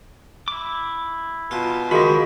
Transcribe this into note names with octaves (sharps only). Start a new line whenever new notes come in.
E4 D6
B2 F4
C#2 D#3 F3 F#4 G#4 D#5 B5